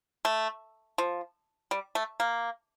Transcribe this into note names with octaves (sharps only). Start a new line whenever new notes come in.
A3
F3
G3
A3
A#3